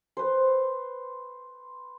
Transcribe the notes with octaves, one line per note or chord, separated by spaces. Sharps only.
B4 C5